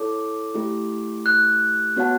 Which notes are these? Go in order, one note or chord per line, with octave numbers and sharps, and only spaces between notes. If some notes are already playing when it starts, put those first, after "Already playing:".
Already playing: E4 A4 C#5 A5 D6
A3 E4 G4
F#6
B3 F#4 C#5 F#5 A5